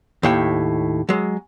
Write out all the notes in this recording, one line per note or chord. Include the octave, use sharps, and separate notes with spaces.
D#2 A2 G5
F#3 G#3